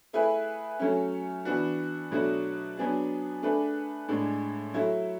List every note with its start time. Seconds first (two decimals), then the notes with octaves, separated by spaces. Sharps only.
0.13 A3 E4 G#4 B4
0.79 F#3 A3 C#4
1.45 E3 B3 D4 F#4
2.11 B2 F#3 A3 D4 F#4
2.77 F#3 B3 D4 G#4
3.42 A3 D4 G#4 B4
4.08 A2 G#3 D4
4.74 F#3 A3 E4